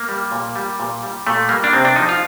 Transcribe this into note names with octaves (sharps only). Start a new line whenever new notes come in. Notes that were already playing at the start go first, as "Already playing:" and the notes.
Already playing: A#3
G3
A#2
G3
A#2
G3
A#2 A3
G3 A#3
D4
C3 C4
D4
F3 D#4
F4